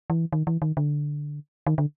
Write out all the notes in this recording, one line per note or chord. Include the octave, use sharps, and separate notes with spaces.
E3
D#3
E3
D#3
D3
D#3
D3